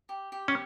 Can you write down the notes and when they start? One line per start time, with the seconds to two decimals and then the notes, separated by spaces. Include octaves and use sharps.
0.09 G4
0.32 G4
0.48 C#4